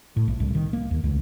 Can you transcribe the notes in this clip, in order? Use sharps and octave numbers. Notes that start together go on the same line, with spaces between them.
A2
A#1
C2
D#3
A#3
D#2
C#2